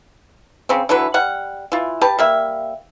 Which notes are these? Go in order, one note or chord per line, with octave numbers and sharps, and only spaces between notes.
C#3 C4
D3 E3 F#3 B4
G3 F#5
E3 F4
G4 B4 A5
G3 A#3 E5